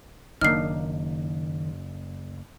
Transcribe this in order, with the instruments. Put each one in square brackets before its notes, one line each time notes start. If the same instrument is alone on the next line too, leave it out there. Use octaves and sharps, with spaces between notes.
[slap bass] F#1 [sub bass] D#3 [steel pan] A#3 D4 D#4 [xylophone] F6 C7